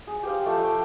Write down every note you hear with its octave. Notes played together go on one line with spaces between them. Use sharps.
G#4
G4 C5 F5
F3 A3 A4
G5